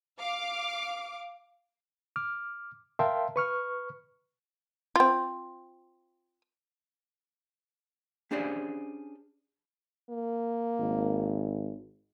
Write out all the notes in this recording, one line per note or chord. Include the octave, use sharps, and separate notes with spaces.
F5 D6
D6 F6
A#4 E5 F5 G5 A5 C6
B4 C#6 F6
C4 F4
C#4 D4 G4 G#4 C5 D5
A#3
G#1